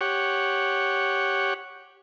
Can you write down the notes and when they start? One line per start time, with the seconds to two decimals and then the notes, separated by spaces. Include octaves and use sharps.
0.01 G4 C#5 F#5